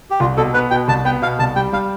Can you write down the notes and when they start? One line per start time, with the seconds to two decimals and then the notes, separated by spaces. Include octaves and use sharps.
0.11 G4
0.20 C2 F4
0.37 B2 A4
0.54 B3 B4
0.71 B2 G5
0.88 C2 A5
1.05 B3 G5
1.22 B2 F5
1.39 C2 A5
1.56 G3 G5
1.73 G3 F5